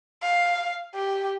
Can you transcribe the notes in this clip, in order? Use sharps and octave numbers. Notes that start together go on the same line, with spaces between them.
F5
G4